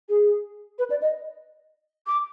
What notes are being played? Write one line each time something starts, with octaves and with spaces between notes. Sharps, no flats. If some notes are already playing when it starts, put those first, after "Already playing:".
G#4
B4
D5
D#5
D6